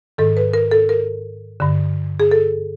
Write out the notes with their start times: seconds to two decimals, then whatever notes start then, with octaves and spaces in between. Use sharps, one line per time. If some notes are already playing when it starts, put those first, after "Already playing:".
0.18 G#2 D#3 A4
0.37 B4
0.54 A#4
0.71 A4
0.89 A#4
1.60 G2 D3
2.20 G#4
2.31 A4